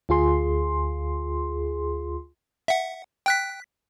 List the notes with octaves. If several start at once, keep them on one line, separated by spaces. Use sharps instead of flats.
D2 F4 G#4 C6
E5 F#5
G5 F#6 B6